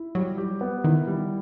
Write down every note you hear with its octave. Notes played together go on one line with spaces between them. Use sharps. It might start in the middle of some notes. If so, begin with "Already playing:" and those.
Already playing: E4
F#3 G3
G4
B3
D#3 E4
G3